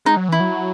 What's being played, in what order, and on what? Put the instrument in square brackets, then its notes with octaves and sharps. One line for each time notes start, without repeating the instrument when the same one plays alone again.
[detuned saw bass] G#3 [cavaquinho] D#4
[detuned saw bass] F#3
[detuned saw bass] E3 [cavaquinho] E4
[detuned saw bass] F#3